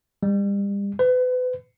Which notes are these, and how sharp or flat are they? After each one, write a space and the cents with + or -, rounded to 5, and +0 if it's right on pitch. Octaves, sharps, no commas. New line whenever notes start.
G3 +35
B4 +35